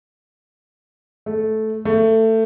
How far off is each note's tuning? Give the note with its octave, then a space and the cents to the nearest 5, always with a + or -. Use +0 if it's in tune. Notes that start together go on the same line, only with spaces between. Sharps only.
A3 -10
A3 +20